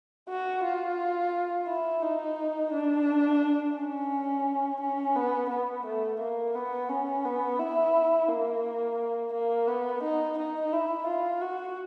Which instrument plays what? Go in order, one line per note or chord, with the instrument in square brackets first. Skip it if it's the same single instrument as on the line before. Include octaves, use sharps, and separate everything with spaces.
[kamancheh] F#4
F4
E4
D#4
D4
C#4
C#4
B3
B3
A3
A#3
B3
C#4
B3
E4
A#3
A#3
B3
D#4
D#4
E4
F4
F#4